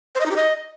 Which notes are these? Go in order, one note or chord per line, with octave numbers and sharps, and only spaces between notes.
C5
D#5
D#4
G4
D#5